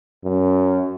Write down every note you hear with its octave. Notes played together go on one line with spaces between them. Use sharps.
F#2